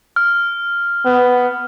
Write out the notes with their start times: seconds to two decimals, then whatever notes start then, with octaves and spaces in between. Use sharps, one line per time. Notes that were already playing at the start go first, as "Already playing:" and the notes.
0.16 F6
1.06 B3